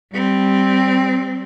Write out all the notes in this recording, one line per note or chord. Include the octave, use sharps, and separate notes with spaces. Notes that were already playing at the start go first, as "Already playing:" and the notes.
G3 C4